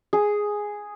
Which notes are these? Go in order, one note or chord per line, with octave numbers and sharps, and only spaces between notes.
G#4